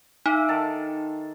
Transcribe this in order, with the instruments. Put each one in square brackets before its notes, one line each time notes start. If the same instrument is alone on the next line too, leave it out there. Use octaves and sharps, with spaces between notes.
[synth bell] D#4 [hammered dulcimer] E5 F5 D6
[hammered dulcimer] D#3 A4 A5